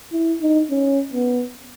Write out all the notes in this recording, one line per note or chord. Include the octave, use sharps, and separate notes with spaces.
E4
D#4
C#4
B3